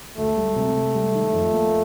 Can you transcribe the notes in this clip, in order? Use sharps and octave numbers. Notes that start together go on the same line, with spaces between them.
D2 A3
G3
C3
C3
G3
D#3
F2
A#3